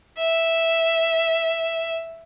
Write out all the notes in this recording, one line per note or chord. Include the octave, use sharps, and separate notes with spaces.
E5